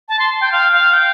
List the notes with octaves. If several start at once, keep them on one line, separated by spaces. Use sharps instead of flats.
A5
C6
G5
F5
F5
G5